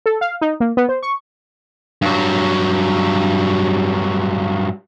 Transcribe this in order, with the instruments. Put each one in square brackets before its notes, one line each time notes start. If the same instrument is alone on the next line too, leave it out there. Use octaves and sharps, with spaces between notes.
[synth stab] A4
F5
D#4
A#3
B3
C5
C#6
[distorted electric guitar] G2 F#3